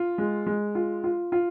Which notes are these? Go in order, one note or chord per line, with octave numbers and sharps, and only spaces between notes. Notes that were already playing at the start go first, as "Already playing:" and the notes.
Already playing: F4
G#3
G#3
F4
F4
F4